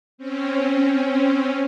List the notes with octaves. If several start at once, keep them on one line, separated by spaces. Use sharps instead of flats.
C4 C#4